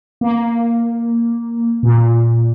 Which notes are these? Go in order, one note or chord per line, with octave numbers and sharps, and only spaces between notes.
A#3
A#2